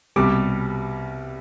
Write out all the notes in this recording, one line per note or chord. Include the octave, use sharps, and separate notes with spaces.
C2 B2 G3 D6